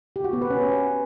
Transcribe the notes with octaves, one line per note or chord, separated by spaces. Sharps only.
G4
F#4
B3
B4
C#4